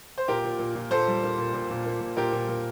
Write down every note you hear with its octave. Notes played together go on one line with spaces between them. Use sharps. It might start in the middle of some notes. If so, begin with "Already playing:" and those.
C5
A#2 G4 A#4
A#2
A#2
A#2
A#2 A4 C5
G3
A#3
A#2
A#2
A#2
A#3
A#2
A#2 G4 A#4
A#2
A#2